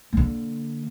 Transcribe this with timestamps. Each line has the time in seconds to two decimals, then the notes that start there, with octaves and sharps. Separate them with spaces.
0.13 D3 A#3